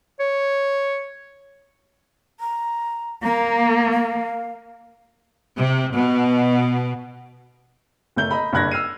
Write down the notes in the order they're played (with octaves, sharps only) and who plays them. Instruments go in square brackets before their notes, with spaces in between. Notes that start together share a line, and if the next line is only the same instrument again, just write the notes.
[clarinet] C#5
[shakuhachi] A#5
[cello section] A#3 [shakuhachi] A#5
[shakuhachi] F5
[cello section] C3
B2
[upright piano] F#1 A3 G6 G7
D#5 A#5 B5
F#1 G2 B5 F#6 G#6 A#6
E6 F6 C7 D#7